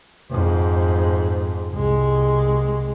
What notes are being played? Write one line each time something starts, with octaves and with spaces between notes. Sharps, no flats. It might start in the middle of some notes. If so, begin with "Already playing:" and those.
F2 G#2
C2 G#3